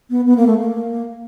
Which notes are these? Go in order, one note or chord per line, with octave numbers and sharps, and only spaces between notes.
B3
B3
A#3
A3
A#3